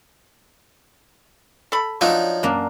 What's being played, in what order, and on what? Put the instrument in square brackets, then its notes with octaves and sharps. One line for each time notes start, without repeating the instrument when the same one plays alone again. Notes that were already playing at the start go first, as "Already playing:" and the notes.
[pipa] A4 B5
[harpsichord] F3 D#4 [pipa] F#3 C#5 [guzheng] D4
[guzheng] F#2 A#3 D4